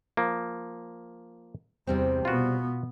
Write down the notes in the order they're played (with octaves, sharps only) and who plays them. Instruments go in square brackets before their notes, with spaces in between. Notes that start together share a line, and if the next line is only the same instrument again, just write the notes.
[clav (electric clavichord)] F3 A#3
[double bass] E2 [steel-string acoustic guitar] C3 G3 C4
[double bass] B2 B3 [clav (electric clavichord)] F4 F#4